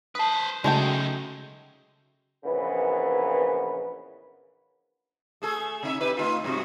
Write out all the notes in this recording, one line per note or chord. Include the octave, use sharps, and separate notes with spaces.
B4 C5 A5 D#6
C#3 F#3 G#3 A3 D#4 F#4 G5
A#1 C#3 E3 B3 A#4 B4
A3 G#4 A4
C3 D#4 E5
D#4 G4 B4
A3 D#4 F4
G2 C3 F#4